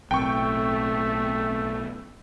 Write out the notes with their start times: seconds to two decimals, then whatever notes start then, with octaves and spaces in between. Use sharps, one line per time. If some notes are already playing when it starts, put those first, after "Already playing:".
0.11 B1 A2 A3 C4 G5 C#6